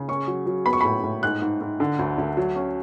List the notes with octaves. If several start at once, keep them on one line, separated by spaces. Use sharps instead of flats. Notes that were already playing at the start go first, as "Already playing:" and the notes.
Already playing: C#3
C#4 C#6
F#3
F#3
B3 B5
C#6
A2 B5
A2
G#2 F#6
G#2
G#2
D3
D2
D2
F#3
C#4